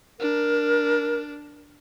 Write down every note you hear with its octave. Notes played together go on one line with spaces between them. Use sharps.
D4 A#4